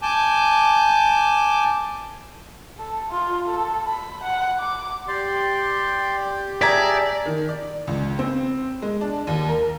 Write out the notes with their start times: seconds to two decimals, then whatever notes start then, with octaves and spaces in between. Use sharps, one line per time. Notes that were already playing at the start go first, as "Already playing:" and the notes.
0.02 G#5 A5 D6 G6
2.79 A4
3.10 F4
3.48 A4
3.87 B5
4.23 F#5
4.59 D6
5.08 G4 D5 C6
6.61 G#4 D5 E5 A5 A#5 G#6 B6
7.26 D#3
7.49 D5
7.87 C#2
8.19 C4
8.82 G#3
9.01 D4
9.27 D#2
9.49 A#4